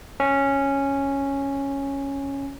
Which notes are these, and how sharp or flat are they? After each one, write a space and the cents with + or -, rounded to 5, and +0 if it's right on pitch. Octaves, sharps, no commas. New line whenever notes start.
C#4 -5